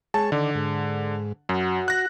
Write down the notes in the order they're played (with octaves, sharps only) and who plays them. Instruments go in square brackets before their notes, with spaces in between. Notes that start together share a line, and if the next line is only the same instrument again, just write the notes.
[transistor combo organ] G#3 G#4 C#5 [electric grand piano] A5
[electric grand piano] D3 [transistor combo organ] D#3 D5
[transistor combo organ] G#2
[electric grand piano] F#2 [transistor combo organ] F#4
[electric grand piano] F#6 A#6